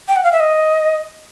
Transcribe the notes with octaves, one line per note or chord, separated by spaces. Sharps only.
G5
F#5
F5
E5
D#5